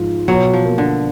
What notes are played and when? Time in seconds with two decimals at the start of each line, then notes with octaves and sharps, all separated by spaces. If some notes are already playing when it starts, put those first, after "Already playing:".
Already playing: G#2 F3 F4
0.28 B2 F#3
0.53 F3
0.65 A#3
0.78 D3